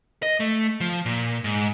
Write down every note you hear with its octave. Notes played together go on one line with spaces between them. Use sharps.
D#5
A3
F3
A#2
G#2